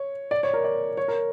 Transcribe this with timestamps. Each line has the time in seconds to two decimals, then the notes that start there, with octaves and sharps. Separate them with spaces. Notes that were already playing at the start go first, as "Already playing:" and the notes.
Already playing: C#5
0.31 D5
0.43 C#5
0.53 A#4
0.64 D5
0.97 C#5
1.08 A#4